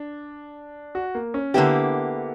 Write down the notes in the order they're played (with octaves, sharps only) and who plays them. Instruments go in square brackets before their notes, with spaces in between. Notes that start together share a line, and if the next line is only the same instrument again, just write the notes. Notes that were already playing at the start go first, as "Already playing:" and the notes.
Already playing: [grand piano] D4
F#4
A#3
C#4
[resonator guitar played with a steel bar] D3 A#3 E4 G4 [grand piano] B3